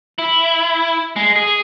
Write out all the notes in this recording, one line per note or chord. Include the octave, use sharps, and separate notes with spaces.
E4
G#3
G#4